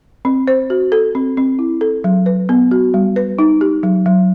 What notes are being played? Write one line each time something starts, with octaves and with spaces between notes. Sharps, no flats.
C4
C5
F#4
A4
C4
C4
E4
A4
F#3
B4
B3
F#4
G3
B4
D#4
G4
F#3
F#3